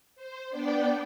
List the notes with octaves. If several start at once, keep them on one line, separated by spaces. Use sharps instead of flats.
C5
B3 D4 D5 G5